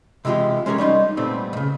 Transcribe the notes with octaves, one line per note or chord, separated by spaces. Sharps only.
C3 E3 G#3 F4 G4
G#3 C#4 G4 A#4 C#5
G3 C#4 D#4 C6
A#2 G3 A3 B3 C4
D#2 C#3